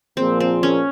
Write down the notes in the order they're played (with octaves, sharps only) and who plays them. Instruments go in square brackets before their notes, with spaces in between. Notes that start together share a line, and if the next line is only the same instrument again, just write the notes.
[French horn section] A#2 F3 A#3 F4 G#4 [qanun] C4
[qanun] C4
C#4